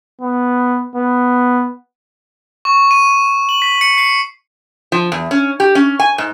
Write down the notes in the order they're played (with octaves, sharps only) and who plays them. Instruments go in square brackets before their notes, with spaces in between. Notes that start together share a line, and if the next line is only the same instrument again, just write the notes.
[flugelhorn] B3
B3
[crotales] C#6
D#7
F#7
B6
C#7
C7
[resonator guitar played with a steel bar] F3
E2
C#4
G4
C#4
G#5
G#2